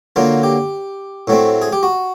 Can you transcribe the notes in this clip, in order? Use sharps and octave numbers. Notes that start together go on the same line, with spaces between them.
D3 F#3 A#3 F4
G4
A2 F#3 A3 C4
G#4
G4
F#4